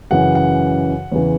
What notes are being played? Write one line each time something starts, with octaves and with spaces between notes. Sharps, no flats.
F#2 C#3 E3 F#5
F#5
E2 C#3 E3